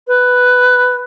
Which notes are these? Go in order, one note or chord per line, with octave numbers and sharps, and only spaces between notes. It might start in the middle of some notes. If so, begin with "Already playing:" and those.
B4